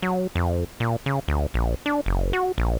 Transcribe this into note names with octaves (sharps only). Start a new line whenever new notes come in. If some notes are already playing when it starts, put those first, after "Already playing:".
F#3
F2
A#2
C#3
D2
A#1
D4
F#1
F#4
A#1